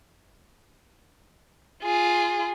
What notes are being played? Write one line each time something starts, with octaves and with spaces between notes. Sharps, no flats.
F4 G#4